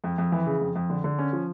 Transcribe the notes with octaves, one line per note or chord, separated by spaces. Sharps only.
F2
F2
E3
C#3
F2
F2
D3
D3
C#4
F3